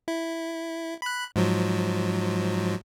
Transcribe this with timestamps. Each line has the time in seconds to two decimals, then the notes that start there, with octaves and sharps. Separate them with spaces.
0.08 E4
1.02 B5 F#6
1.36 G#2 F3 F#3